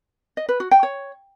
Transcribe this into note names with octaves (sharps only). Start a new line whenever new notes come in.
D#5
B4
F#4
G5
C#5